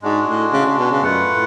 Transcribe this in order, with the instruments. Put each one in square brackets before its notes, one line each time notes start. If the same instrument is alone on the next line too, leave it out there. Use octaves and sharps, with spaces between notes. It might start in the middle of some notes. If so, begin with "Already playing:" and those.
[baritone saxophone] G#2 [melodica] G#3 D4 F#4
[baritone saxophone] A2
C#3
C#3
B2
C#3
[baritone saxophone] F#2 [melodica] A3 F4 B4 F#5
[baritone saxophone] A2